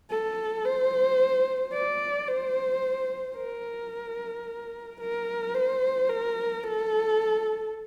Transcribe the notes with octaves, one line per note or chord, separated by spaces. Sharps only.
A4
C5
D5
C5
A#4
A#4
C5
A#4
A4